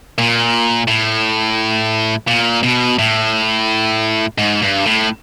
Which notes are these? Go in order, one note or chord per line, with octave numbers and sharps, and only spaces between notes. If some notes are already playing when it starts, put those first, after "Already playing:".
A#2
A2
A#2
B2
A2
G#2
G2
A2